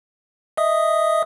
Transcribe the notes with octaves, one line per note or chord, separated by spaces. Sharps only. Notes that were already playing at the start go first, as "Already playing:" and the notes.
D#5 E5 D#6